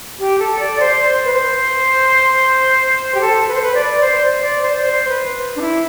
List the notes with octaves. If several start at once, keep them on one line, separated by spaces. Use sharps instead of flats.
G4
A4
D5
C5
B4
C5
G4
A4
B4
C5
B4
D5
C5
D5
C5
C5
B4
D4
E4